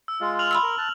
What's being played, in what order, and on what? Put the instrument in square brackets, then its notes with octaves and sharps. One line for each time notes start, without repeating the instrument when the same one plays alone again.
[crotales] E6
[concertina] G#3 F4
[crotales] F6 F7 F#7
[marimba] B5 C6 E6
[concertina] A#4
A5 F#6